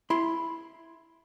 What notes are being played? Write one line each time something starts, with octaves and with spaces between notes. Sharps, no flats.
E4 B5 C6